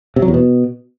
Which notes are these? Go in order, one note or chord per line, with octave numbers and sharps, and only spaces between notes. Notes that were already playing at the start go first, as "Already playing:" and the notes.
C3
F#3
E2
B2